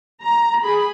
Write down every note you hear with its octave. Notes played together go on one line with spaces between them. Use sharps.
A#5
G#4 B5